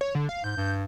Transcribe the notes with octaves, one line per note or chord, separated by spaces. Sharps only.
C#5
D3
F5
G#2 G6
G2